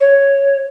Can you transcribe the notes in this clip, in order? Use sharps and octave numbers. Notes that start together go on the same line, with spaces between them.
C#5